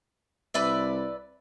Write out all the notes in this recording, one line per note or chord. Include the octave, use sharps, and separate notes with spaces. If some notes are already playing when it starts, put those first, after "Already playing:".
C2 B4 D5 E5